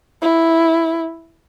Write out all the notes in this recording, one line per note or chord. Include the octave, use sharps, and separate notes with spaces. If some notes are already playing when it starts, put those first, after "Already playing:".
E4